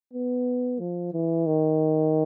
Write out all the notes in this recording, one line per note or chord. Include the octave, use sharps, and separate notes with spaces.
B3
F3
E3
D#3